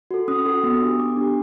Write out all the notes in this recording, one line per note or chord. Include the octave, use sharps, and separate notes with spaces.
F#4 A4
C#4 D#6
F#4 A4
B3
D4 G4
B3 D6
D4 G4